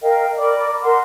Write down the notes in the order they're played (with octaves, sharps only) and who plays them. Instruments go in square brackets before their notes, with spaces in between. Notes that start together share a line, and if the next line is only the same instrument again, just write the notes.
[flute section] A#4 D#5 F5 G5
A#4 D5 B5 D6
A#4 F#5 C6